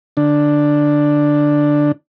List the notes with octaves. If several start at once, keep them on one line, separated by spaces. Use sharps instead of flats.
D3 D4